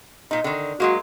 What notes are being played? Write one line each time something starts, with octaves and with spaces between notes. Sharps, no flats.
A#2 D#4
D3 D#3
F#3 G#3 A#3 F#4